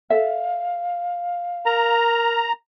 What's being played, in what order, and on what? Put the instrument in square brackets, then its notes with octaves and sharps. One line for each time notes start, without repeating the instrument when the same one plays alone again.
[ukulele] A4 E5 [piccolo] F5
[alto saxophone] A#4 [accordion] A#5